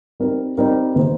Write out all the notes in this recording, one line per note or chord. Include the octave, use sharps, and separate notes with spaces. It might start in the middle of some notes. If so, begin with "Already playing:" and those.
G3 C4 D#4 A#4
G3 C4 D#4 A#4
D#3 A#3 D#4 C5